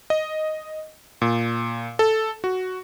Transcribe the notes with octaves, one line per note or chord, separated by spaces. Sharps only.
D#5
A#2
A4
F#4